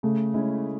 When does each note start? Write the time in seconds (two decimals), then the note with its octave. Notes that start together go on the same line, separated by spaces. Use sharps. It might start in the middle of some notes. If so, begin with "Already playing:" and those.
0.03 C#3 A3
0.34 G#3 C#4 E4